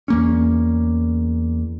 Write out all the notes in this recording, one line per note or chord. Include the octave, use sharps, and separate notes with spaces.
E2 A#3 C#4